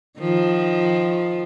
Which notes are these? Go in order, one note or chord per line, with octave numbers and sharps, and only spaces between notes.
D#3 F3